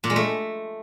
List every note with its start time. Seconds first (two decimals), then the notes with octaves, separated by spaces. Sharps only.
0.04 A#2
0.10 G#3
0.16 A3